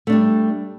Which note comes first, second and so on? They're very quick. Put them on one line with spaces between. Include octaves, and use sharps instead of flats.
A3 D4 G3